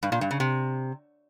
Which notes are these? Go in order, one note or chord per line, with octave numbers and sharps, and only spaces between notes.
G2
A#2
G2
C#3
C3